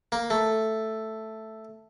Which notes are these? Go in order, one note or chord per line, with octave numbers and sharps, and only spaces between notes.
A#3
A3